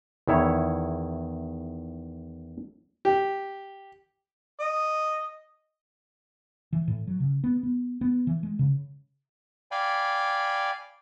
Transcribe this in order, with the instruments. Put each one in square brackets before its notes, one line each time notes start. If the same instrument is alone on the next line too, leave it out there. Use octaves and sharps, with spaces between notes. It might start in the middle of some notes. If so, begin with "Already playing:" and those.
[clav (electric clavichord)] E2 D#3 E4 C#5
[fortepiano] G4
[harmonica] D#5
[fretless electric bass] E3
A2
F#3
C#3
B3
B3
B3
E3
G#3
C#3
[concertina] D5 F5 G5 G#5 B5